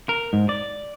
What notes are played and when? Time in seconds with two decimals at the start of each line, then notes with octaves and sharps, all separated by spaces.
0.09 A#4
0.33 G#2
0.49 D5